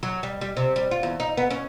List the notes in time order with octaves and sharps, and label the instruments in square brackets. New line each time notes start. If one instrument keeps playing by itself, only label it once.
[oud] F#3
G3
G3
C3
G3
F4
E2
D#4
B3
C#4